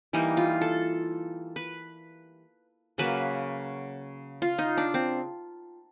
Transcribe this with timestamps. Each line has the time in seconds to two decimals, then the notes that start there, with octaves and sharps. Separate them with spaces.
0.13 E3 G3 A#3 D#4
0.37 F4
0.61 A4
1.56 B4
2.98 C#3 F#3 A#3 B4
4.42 F4
4.58 D#4
4.77 D4
4.94 C4